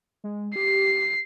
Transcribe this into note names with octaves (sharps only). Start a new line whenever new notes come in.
G#3
G4 C7